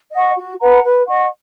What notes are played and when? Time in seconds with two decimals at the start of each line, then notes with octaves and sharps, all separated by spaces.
0.12 D#5 F#5 C#6
0.35 F#4
0.59 B4 F#5 A#5
0.83 B4
1.06 D#5 F#5 C#6